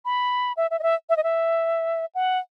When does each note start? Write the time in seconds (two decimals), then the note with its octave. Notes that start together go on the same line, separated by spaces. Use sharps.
0.05 B5
0.57 E5
0.71 E5
0.79 D#5
0.83 E5
1.10 E5
1.17 D#5
1.24 E5
2.15 F#5